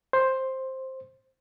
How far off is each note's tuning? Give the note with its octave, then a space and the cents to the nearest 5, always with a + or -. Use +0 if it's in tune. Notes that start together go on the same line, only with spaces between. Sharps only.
C5 +10